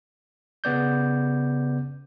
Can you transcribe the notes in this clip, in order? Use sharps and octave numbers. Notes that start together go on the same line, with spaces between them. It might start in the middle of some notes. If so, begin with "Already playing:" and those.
C#3 B3 D5 G6